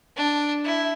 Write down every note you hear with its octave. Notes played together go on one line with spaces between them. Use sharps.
D4
E4